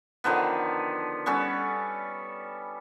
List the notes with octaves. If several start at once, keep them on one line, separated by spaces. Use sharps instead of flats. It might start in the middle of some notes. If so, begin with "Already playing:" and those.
D3 D#3 F3 B3
G3 B3 C#4 A4